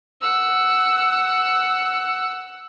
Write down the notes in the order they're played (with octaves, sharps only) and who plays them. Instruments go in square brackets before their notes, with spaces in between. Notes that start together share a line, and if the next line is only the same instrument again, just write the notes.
[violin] F#5 E6